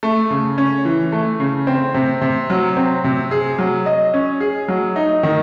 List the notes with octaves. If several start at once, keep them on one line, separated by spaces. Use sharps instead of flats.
A3
C#3
C#4
E3
A3
C#3
C4
C3
C3
F#3
C4
C3
G#4
F#3
D#5
C#4
G#4
F#3
D#4
D#3